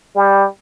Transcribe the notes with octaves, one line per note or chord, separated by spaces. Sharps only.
G3